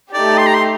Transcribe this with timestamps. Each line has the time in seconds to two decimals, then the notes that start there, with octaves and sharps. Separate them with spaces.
0.13 A3 D#4 G4 D5
0.38 C6
0.47 A#5
0.54 C6